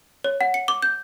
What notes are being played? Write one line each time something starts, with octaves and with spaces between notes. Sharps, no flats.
C#5
F#5
C#7
D6
G6